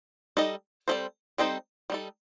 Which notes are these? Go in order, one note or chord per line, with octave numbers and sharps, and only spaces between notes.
G3 D#4 A4 D#5
G3 C4 D#4 A4 C5
G3 C4 D#4 A4 C5
G3 D#4 A4